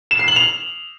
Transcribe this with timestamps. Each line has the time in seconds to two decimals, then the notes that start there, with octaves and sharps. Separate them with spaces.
0.11 E7
0.19 C7
0.28 F#7
0.36 F7